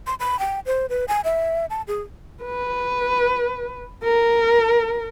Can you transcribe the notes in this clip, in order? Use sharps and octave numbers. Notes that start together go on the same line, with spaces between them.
C6
B5
G5
C5
B4
G#5
E5
A5
G#4
B4
A#4